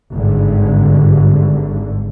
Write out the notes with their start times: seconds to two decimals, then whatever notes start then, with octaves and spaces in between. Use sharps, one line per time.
0.12 G#1 G2 D3